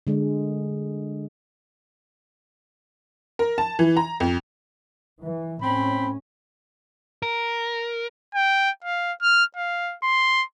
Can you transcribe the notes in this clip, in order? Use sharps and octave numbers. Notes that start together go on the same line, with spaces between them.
D3 G#3
A#4
A5
E3
A#5
F2
E3
A2 C4 C#4 B5
A#4
G5
F5
F6
F5
C6